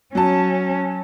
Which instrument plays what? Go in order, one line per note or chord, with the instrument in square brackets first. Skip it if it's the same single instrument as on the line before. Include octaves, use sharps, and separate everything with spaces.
[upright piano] F#3 A5 [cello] C#4